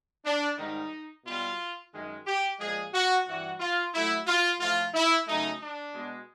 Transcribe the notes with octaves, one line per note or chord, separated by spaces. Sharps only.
D4
G#2 D#3 G3 D#4
B2 G3 F4
F#2 D#3 G#3
G4
A#2 F3 G#3 G#4
F#4
G2 E3 G3 F#4
F4
A2 F#3 A3 E4
F4
A2 F3 A3 F4
E4
C#3 F#3 A3 D#4
D4
B2 G#3